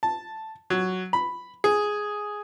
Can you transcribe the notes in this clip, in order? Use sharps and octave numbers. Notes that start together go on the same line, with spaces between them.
A5
F#3
B5
G#4